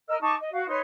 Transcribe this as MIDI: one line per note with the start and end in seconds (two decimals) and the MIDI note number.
0.08 0.16 70
0.08 0.16 75
0.08 0.16 88
0.08 0.16 89
0.21 0.34 63
0.21 0.34 81
0.21 0.34 85
0.21 0.34 86
0.40 0.50 75
0.52 0.66 66
0.52 0.66 77
0.68 0.80 63
0.68 0.80 71
0.68 0.80 73
0.68 0.80 84